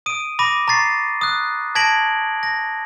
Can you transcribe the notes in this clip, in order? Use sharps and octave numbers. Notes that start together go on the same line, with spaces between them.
D#6 D7 D#7
B5 D6 A#6 D#7
A#5 C#6 A6 C7
D#6 F#6
A5 G#6 A#6 B6 D7 F#7
A#6